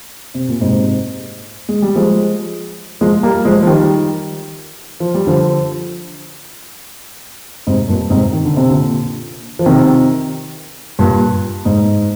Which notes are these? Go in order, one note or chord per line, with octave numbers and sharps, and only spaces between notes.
C3
A#2
G#2 C3
G#3
G3
F3 G#3
F3 G#3
G3 A#3
F3 G#3
F3
D#3 G3
F3
G3
D3 F3
G#2 C3
G2 A#2
G#2 C3
D#3
D3
C3
A#2 D3
F3
C3 D#3
G2 A#2
G#2